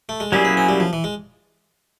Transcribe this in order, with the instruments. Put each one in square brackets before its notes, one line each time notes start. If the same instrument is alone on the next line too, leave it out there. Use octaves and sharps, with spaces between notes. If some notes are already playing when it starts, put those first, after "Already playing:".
[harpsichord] A3
G#3
[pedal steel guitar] F#3 A#3 C#4 E4 G#4 [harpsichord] G3
[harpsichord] B3
C4
G3
F3
E3
G#3